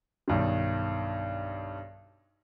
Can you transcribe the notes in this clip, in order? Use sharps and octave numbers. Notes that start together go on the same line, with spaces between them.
B1 G2 D#3